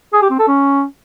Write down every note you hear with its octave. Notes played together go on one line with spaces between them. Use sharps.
G#4
G4
C4
A4
C#4